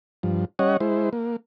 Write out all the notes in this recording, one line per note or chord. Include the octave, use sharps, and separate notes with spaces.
G2 F3
G3 C#4 C#5 D#5 F#5
G#3 E4 C5
A#3